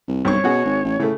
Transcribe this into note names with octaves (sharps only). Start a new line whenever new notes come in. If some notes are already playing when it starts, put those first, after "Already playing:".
C2
B1 G2 C4 C#5 C#6
B2 C#4 F#4 G#4
G#1
A1
A2 C#3 A3